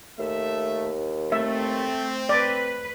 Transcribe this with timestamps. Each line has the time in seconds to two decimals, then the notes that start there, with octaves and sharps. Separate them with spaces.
0.19 D#2 A3 E5
1.32 A3 C4 E5
2.29 B4 D5